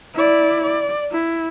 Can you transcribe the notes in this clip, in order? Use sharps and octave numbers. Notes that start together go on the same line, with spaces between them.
E4 D5
D5
E4